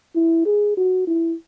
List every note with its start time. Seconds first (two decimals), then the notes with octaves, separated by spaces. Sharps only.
0.15 E4
0.46 G#4
0.77 F#4
1.07 E4